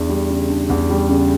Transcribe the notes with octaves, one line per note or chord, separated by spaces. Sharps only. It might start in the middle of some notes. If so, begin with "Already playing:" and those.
Already playing: E2 D4
G3
C#3
D4
E2
G3
C#3